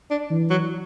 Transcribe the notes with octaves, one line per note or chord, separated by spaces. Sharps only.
D4
E3
F#3